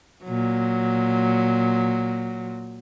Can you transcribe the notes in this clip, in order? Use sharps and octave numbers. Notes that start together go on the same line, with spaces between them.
A#2 F#3